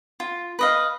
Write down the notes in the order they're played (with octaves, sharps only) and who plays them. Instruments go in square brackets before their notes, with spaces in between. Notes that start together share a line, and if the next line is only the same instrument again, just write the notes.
[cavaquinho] F4
B4 D#5 F5